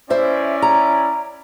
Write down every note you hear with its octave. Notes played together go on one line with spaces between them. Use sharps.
C#4 E4 C5 D5 E5
A#5